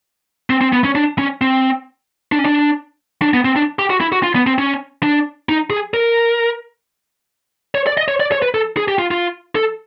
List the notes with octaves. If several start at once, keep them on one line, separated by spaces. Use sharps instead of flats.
C4
C4
B3
C#4
D4
C#4
C4
D4
C#4
D4
D4
B3
C4
D4
G4
F#4
E4
F#4
F4
B3
C4
C#4
D4
D#4
G#4
A#4
C#5
D5
D#5
C#5
D5
C#5
B4
A4
G#4
G4
F4
F4
A4